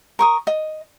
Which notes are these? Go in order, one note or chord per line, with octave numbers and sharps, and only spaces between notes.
A#4 C#6 D#6
D#5